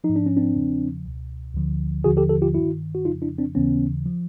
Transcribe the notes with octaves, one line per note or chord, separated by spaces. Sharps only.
F3 D#4
G#2
D4
C#4
C4 D4
E2 C#3 F3
C#2 B2
D2 D3 F3
D#2 D3 F3 F#4 G#4
G4 A4
G4 A4
F4 G4
G2 D#3 E4 F#4
F#4
F2 C#3 F3 D#4 F4
D4 E4
C4 D4
D#2 C#3 E3 B3 C#4
F3